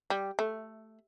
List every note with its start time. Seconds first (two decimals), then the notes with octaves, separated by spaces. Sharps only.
0.10 G3
0.39 A3